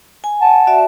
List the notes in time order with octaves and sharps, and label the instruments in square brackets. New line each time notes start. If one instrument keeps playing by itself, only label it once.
[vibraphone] G#5
[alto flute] F#5 [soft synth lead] A5
[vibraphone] F#4 D5 E5